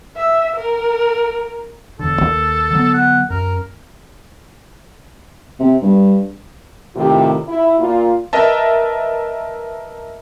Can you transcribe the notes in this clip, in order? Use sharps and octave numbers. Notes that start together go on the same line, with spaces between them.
E5
A#4
E1 D3 A4
D#2
D3 F#3 B3
F#5
F#2 A#4
C3
G2
A2 C3 D#3 F4 G4
E4
A#2 F4
A#4 B4 D#5 E5 A5